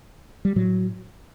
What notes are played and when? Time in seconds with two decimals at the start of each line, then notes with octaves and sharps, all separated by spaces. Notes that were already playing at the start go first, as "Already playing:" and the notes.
0.45 G3
0.56 A2 F#3